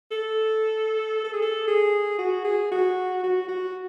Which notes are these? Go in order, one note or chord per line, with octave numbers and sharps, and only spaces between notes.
A4
A4
G#4
A4
G#4
F#4
G#4
F#4
F#4
F#4